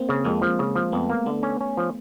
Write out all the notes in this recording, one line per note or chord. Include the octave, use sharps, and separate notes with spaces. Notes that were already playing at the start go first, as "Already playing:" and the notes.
Already playing: A#3 C4
C#3
F2 G#3 A#3
F3
C#3
F3
F2 A3 B3
A#3
D3 A3 B3
C#4
C#4
F3